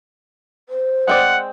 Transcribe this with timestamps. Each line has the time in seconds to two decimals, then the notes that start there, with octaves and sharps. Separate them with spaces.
0.69 C5
1.08 G#3 C4 D5 F#5